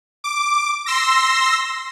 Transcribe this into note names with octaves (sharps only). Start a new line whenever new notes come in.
D6
C6 E6 A#6